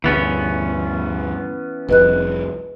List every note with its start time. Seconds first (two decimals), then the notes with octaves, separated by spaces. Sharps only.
0.04 D2 G2 E3 B3 C#4
1.89 F1 C2 F2 B4 D#5 F#6